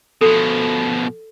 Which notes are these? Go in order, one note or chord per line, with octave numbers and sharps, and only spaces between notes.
B2 F3 A4